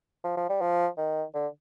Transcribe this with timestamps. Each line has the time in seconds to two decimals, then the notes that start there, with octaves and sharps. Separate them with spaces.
0.24 F3
0.37 F3
0.49 G3
0.61 F3
0.98 D#3
1.34 D3